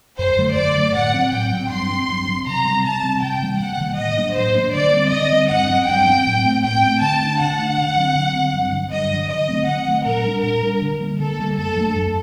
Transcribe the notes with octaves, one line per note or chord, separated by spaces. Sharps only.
F#2 C5
D3 F#3 A3
F#2 D5
D3 F#3 A3
A2 F#5
F#3 C4
A2 G5
F#3 C4
G2 C6
F#3 C4
G2
F#3 C4
C3 A#5
G3 C4
C3 A5
G3 C4
C3 G5
D#3 G3 A#3
C3 F#5
D#3 G3 A#3
A2 D#5
F#3 A#3 D4
A2 C5
F#3 A#3 D4
D3 D5
G3 C4
D3 D#5
G3 C4
G2 F#5
F#3 C4
G2 G5
F#3 C4
A2
A3 C4
A2 G5
A3 C4
D3 A5
A3 D4
D3 F#5
A3 D4
D3
F#3 C4
D3
F#3 C4
G2
D3 F#3
G2 D#5
D3 F#3
D3 D#5
F#3 A3 C4
D3 F#5
F#3 A3 C4
A#2 A#4
G3 D4
A#2 A#4
G3 D4
D3
G3 A#3
D3 A4
G3 A#3
F#2 A4
F#3 A3 D4
F#2